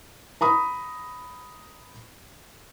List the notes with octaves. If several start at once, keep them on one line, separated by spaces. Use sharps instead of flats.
A#5 B5 D#6